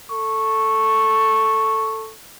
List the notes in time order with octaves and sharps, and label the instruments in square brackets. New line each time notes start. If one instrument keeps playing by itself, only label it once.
[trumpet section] A4 C#6